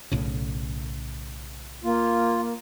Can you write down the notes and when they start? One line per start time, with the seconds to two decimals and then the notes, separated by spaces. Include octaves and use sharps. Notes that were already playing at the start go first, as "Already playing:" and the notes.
0.11 B1 A2 C#3
1.84 A#3 F4